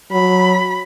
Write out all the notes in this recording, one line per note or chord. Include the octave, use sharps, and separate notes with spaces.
F#3 B5